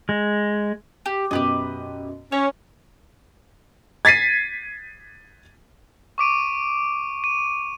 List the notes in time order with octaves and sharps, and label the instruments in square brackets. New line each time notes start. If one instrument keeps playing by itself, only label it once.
[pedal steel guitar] G#3
[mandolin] G4
[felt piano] F#2 B2 [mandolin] G4 B4 D#5
[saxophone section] C#4 [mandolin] C#5
[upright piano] G#6 A6 B6 C7 D#7
[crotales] C#6 D6 D7 D#7
D#7